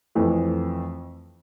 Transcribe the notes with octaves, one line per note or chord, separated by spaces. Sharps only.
F2 E3 A3